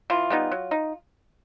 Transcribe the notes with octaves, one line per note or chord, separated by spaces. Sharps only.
E3 F4
G3 B3 D#4
F#3
D#4